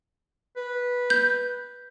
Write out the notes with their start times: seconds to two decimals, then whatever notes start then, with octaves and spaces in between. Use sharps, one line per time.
0.56 B4
1.10 G6